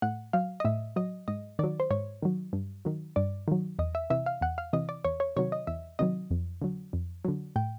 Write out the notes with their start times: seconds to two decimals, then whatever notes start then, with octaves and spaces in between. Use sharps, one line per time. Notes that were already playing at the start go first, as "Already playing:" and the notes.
0.02 A2 F#5
0.33 F#3 F5
0.60 D#5
0.65 A2 E5
0.96 F#3 D#5
1.28 G#2 D#5
1.59 D#3 D5
1.64 F#3
1.80 C5
1.90 G#2 C#5
2.22 D#3 F#3
2.53 G2
2.85 D#3 F#3
3.16 G2 D5
3.48 D#3 F#3
3.79 E2 D#5
3.95 E5
4.10 C3 E3 E5
4.26 F5
4.41 E2 F#5
4.58 F5
4.73 C3 E3 D#5
4.89 D5
5.05 E2 C#5
5.20 C#5
5.36 C3 D#3 F#3 C#5
5.52 D#5
5.67 E2 E5
5.99 C3 D#3 F#3 D#5
6.31 F2
6.62 D3 F#3
6.93 F2
7.24 D3 F#3
7.56 A2 G5